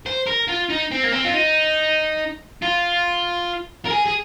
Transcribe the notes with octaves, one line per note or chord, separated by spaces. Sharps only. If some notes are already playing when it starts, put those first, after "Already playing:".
C5
A#4
F4
D#4
C4
A#3
C4
F4
D#4
F4
A#4
G#4
G#4